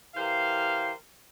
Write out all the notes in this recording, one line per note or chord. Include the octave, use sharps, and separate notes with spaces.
E3 G4 A#4 C5 F5